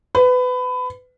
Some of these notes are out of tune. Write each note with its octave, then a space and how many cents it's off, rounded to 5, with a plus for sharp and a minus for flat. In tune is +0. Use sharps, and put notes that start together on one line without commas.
B4 +25